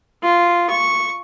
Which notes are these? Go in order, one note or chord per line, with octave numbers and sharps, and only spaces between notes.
F4
C#6